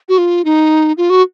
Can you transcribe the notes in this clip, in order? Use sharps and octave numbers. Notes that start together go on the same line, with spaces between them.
F#4
F4
D#4
F4
F#4